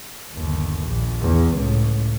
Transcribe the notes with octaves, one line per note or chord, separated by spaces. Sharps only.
G1 D#2
A#1
E2
C#2 A2